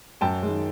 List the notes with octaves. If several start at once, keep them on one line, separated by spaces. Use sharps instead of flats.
F#2 G5 A5
D#3 G#3